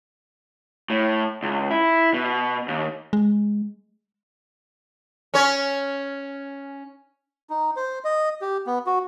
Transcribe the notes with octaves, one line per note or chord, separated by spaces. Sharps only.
A2
C#2
E4
B2
D#2
G#3
C#4 C#5
D#4
C5
D#5
G4
B3
F#4